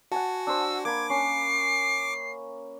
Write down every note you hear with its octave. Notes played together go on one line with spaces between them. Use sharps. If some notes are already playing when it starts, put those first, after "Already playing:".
F#4 F#5 G#5 A5
D4 C5 E6
A#3 B5 D6 G#6
C#4 C7